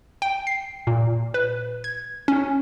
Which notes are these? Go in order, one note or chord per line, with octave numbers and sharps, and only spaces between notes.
G5
C7
A#2
B4
G#6
C#4